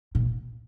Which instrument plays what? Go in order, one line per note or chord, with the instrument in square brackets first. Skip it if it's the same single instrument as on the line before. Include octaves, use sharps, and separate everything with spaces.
[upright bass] A#2